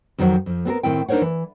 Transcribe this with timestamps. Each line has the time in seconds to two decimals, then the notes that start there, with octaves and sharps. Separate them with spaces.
0.18 F2 D#3 F#3 E4 C5 F#5
0.46 F2 F3
0.65 B3 C4 G#4 A#4
0.83 A2 D#3 C4 E4 G5
1.08 D4 D#4 A#4 C5 C#5 F#5
1.21 E3